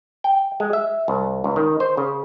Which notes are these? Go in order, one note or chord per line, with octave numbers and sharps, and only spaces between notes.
G5
G#3
E5
C2
C#2
D#3
C5
C#3